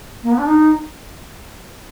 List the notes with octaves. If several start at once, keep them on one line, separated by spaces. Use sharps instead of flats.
A#3
B3
D4
D#4